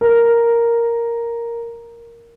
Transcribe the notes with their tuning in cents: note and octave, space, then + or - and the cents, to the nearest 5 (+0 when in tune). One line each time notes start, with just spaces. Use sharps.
A#4 +0